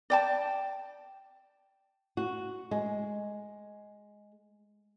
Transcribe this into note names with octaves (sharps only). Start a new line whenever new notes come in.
D5 G5 A5
F#4
G#3